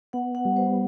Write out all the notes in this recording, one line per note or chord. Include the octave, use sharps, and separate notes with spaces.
B3 F#5
F#5
G3
C5